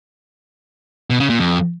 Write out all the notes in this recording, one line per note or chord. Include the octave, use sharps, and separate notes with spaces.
B2
C#3
A#2
F2